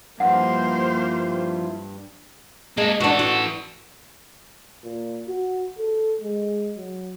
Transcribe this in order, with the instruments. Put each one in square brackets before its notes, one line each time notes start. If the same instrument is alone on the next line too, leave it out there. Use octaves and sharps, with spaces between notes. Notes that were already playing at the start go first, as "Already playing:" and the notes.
[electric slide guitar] G2 [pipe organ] F3 E4 F4 [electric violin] A#3 C5 [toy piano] F#5
[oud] G#3 [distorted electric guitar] A#3 A4
[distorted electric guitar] E3 A4 [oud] D4 F#4
[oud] F#4
[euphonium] A#2
F#4
A4
G#3
F#3